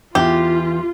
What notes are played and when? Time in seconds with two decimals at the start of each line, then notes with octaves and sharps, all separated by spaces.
0.15 E2 E3 F4 G4